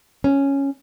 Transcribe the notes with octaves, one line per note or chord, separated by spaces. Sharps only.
C#4